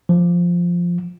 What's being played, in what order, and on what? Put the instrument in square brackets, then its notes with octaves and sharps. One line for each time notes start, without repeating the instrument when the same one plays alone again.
[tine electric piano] F3